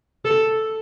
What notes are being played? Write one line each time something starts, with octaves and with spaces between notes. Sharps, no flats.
A4